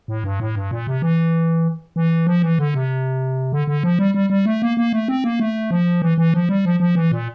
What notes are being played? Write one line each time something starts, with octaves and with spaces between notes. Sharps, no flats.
A2
G2
A2
G2
A#2
C3
E3
E3
F3
E3
D3
C3
D3
D3
F3
G3
G3
G3
A3
A#3
A#3
A3
C4
A#3
A3
F3
E3
E3
F3
G3
F3
F3
E3
A#2